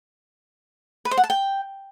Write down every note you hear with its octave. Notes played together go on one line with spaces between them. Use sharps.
B4
C5
F#5
A5
G5